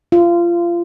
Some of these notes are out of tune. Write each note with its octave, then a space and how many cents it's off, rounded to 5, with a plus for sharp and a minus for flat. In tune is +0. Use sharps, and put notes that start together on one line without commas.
F4 -25